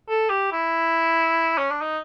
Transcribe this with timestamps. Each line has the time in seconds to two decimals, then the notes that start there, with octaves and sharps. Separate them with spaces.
0.09 A4
0.30 G4
0.52 E4
1.58 C#4
1.70 D4
1.82 D#4